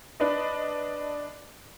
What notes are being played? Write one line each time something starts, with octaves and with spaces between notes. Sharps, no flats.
D4 B4 D#5